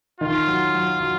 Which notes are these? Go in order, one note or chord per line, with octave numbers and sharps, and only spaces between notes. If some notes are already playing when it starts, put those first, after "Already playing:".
D#3 F4
F#3
F#3
F#3